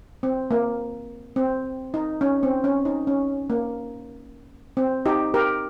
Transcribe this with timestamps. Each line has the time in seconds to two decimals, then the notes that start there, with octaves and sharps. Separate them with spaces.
0.23 C4
0.51 A#3
1.36 C4
1.94 D#4
2.21 C#4
2.43 C4
2.64 C#4
2.85 D#4
3.07 C#4
3.50 A#3
4.77 C4
5.06 D#4 G4
5.34 G4 A#4